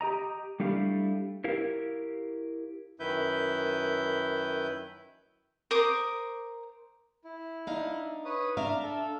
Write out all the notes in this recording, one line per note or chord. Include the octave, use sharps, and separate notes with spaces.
G4 D#5 A#5
G3 A3 D4 E4 G4 F5
E4 G4 A#4 F5
F#2 D#3 E4 B4 G6
A#4 C5 D6 D#6
E4
D4 D#4 F5
B4 C#5 D#6
D4 E5 F5 A#5
A4